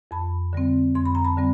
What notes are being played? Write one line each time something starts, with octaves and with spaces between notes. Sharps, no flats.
F2 A5 B5
D3 G3 C4
F2 C6
B5
A#5
A5 B5
D3 G3 C4